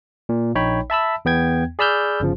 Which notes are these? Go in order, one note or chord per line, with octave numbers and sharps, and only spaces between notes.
A#2
A#1 D#4 C#5 G5 B5
E5 A5 B5 E6
E2 B3 G5 G#6
G#4 D5 B5 E6 F6 G6
G1 C#3 F3